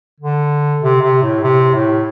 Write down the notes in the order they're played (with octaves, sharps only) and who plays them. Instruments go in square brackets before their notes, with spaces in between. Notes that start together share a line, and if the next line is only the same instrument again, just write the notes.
[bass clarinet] D3
C3
C3
A2
C3
A2